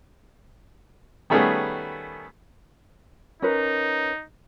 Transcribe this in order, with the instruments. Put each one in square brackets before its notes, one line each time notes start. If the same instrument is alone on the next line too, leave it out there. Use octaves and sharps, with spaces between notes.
[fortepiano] D#3 G3 A3 B3 C#4 G#4
[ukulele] C#4 A#4 B4 [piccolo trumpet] D#4